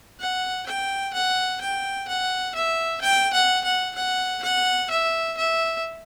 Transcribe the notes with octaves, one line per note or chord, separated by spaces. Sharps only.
F#5
G5
F#5
G5
F#5
E5
G5
F#5
F#5
F#5
F#5
E5
E5